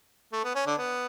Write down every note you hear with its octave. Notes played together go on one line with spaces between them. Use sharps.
A3
B3
C#4
D3 D4
B3